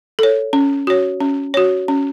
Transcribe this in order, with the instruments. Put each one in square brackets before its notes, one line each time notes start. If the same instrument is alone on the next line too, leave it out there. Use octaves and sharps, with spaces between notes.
[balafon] A4 C#5
C#4
F#4 C#5
C#4
F#4 C#5
C#4